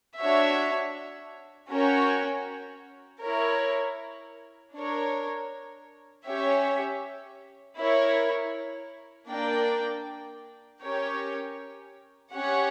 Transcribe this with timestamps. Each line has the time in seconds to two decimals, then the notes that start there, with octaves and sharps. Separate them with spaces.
0.19 D4 F#4 C#5 E5
1.71 C#4 F#4 A#4 C#5 G5
3.23 E4 A#4 C#5
4.75 D4 A#4 C#5
6.26 C#4 G4 C#5 E5
7.78 E4 A#4 C#5
9.30 A#3 D4 A#4 D5 G5
10.82 C#4 G4 A#4 C#5 G5
12.34 C#4 G4 C#5 F#5